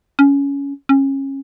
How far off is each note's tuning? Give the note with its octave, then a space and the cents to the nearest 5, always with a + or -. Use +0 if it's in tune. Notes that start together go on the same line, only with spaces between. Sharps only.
C#4 +15
C#4 -25